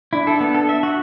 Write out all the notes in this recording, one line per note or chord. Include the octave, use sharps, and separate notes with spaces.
D4 E4
A4
B3
A4
E5
F#4